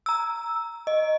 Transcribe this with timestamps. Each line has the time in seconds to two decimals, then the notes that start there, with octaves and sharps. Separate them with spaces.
0.06 A#5 E6
0.87 D#5